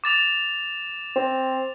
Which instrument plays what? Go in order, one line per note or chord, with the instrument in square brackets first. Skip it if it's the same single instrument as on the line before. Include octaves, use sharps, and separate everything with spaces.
[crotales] D6 A6 F7
[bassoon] C4